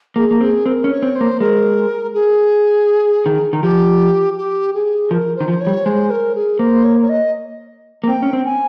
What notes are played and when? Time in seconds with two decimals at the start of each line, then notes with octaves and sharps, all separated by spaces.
0.16 A#3 G#4
0.31 A#3
0.41 C4 G#4
0.66 C4 A#4
0.84 C#4
0.91 C#5
1.02 C4
1.15 C5
1.21 A#3
1.40 G#3 A#4
2.14 G#4
3.26 D#3
3.53 D#3
3.63 F3 G4
4.37 G4
4.74 G#4
5.11 F3 A#4
5.36 D#3 C5
5.48 F3
5.61 C#5
5.67 G3
5.85 G#3 C5
6.10 A#4
6.35 G#4
6.59 A#3 C5
6.84 C#5
7.03 C#5
7.09 D#5
8.04 A#3
8.07 C4 G5
8.22 C#4
8.33 C4
8.45 G#5